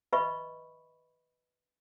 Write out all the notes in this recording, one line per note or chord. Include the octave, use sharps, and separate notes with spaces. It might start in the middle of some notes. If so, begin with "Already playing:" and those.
B4 D#5 E5 B5 C#6